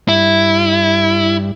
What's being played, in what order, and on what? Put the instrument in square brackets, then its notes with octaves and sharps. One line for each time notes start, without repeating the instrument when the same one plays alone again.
[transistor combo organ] G2 [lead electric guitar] E4